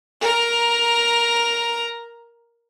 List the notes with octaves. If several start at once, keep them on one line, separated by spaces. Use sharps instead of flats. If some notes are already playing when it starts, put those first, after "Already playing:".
A#4 A#5